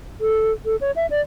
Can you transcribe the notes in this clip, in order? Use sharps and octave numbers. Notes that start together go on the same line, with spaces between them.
A4
A4
C#5
E5
D5